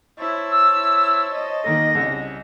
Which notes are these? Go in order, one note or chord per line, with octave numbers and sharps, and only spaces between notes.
E4 C5 C#5 A5
E6
E4
D#5
D#3 A#3 A4 A#6
C2 C#3